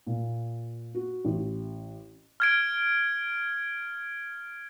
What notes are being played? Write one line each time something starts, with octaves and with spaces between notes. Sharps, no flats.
A#2
F#4
A1
F6 G#6 D7